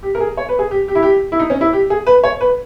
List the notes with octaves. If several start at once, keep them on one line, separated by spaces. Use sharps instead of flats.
G4
A#4
G#4
C#5
B4
G#4
G4
G4
E4
G4
E4
D#4
C#4
E4
G4
G#4
B4
C#5
B4